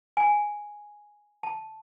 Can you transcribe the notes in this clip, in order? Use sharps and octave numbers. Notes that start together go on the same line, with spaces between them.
G#5
A5